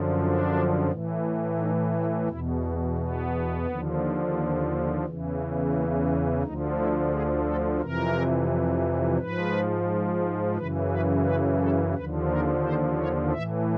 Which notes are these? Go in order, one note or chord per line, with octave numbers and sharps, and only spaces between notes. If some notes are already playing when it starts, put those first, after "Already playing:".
Already playing: F#2 D3 F3
D4
A2 E3
D#4
E4
E2 B2 E4
B3
B3
D#2 D3 F3
E2 C#3 E3
A#3
B3
D2 D3 F3 D#4
E4
G#4
A4
F2 C3 E3 A#4
G#2 F3 B4
F#2 C#3 E3 B4
B4
B4
A4
D#2 D3 F3 B4
A#4
C5
C#5
A2 E3 E5